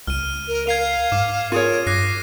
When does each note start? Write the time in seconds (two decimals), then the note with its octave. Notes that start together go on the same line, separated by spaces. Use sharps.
0.07 C#2 F6 D#7
0.48 A#4
0.67 A#4 F5 G#6 C7 F7
1.12 G#2 D6
1.52 F4 G#4 A#4 C#5 D#7
1.87 G2 D6 F#6 A#6 C7